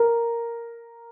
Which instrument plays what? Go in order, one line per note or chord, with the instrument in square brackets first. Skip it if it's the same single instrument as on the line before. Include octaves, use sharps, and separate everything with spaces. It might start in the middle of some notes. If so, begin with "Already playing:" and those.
Already playing: [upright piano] A#4